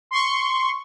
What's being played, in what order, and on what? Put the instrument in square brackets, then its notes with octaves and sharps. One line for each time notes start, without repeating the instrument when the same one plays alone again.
[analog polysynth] C6 C#6